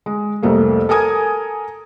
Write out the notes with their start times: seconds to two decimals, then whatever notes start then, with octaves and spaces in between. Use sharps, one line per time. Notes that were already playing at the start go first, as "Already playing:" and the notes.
0.06 G#3
0.43 C2 F2 A3 A#3
0.89 A4 A#4 G#5 D#6 G#6